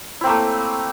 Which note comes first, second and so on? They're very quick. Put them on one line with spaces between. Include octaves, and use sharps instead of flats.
E4 C4 A#3 A3